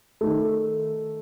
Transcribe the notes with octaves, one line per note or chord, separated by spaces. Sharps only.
D#3 A3